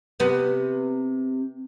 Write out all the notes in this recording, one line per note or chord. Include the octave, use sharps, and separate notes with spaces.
C3 B3